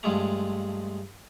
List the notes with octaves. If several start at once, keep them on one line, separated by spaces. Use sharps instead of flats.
G2 F3 G#3 A3 A#5